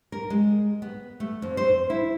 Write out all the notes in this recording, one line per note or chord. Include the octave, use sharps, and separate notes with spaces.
A#4
G#3
B3
A3
F2
C5
E4